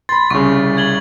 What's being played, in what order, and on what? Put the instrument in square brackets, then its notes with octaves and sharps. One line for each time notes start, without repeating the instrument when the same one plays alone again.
[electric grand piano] B5 C6 [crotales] A6
[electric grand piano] C2 C#3 [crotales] C#6
[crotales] G#6 F#7 G7